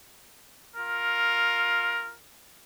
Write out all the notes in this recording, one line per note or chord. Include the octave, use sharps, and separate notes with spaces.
F4 A#4